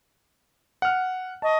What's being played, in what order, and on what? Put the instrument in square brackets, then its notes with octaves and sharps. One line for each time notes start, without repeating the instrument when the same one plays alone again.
[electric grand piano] F#5 F6
[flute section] D#5 C#6 [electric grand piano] A5